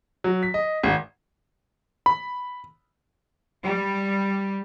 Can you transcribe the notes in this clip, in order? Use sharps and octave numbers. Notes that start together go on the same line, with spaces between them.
F#3
B6
D#5
G#1
B5
G3